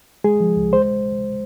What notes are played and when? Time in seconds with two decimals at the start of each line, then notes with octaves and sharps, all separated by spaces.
0.24 G#3 G#4
0.40 F3
0.57 C#2
0.73 G#3 C5